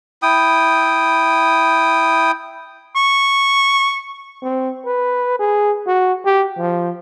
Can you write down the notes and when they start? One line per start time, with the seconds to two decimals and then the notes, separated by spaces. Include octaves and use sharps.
0.22 E4 G5 D#6
2.96 C#6
4.43 C4
4.86 B4
5.39 G#4
5.87 F#4
6.25 G4
6.58 F3